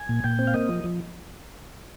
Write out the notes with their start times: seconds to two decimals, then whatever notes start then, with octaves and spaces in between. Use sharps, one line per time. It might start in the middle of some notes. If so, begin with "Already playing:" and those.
Already playing: G#5
0.09 A#2
0.24 A#2 G5
0.39 C4
0.47 F5
0.54 A#3 D#5
0.69 F3
0.84 F3